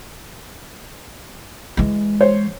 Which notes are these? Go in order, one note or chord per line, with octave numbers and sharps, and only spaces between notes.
E3 G#3
C5 C#5